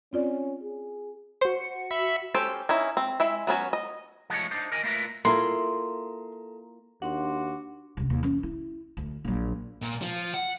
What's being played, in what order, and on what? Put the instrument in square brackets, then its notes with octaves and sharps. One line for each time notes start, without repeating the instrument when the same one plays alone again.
[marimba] C4 F4 D5 [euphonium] C#4
[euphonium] G#4
[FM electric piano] F#4 C#7 [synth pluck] C5
[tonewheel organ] E5 B5
[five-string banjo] C#4 G4 A4 C5
C#4 D#4 E4
C4
G#3 E4 E5
F#3 B3 C#4 F#4
D#5
[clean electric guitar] F3 G#3 A3 D#4 C#5
D4 D#4 C5
A#4 D#5 G#5
A3 A#3 E4 F4 A#4 B4
[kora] A#3 E4 F4 [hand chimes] A4 A#5 [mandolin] C6
[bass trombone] D#2 [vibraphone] D4 C6 D6 [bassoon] F#4
[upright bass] C#2 C3
D#2
E3 C#4
E4
D2
A#1 F#3
[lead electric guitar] A#2
F3
F#5